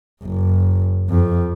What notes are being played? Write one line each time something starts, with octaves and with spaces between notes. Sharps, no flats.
F#1
F2